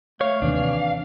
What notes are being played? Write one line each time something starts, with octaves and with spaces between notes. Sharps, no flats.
A3 C#5 F5
D#2 C3 E3 D4